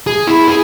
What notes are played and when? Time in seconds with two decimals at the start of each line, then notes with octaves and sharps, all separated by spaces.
0.07 G#4
0.27 E4
0.48 G#4